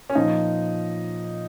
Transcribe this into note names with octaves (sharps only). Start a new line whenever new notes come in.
C#4
A#2 F3 D#4